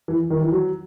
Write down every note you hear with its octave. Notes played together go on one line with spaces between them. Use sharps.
E3
D#3
E3
F#3